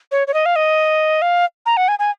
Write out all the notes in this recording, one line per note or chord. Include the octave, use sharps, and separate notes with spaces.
C#5
C#5
D#5
F5
D#5
F5
A#5
F#5
G#5
G#5